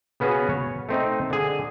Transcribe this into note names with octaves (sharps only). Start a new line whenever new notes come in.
C#3 B3 C#4 F#4 G#4
C#5
A3 C4 D#4
D3 G#4